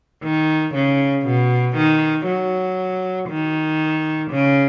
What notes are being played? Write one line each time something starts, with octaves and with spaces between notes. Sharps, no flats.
D#3
C#3
B2
D#3
F#3
D#3
C#3